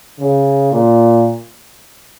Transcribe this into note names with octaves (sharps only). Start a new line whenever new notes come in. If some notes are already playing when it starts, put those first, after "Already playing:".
C#3
A#2